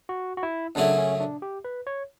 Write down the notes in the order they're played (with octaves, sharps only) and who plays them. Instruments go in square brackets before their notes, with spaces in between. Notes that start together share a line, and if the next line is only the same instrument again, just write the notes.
[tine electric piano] F#4
F#4
E4
[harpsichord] F#2 C#3 F#3 A3 E4 [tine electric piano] D4
[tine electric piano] C#4
D4
G4
B4
C#5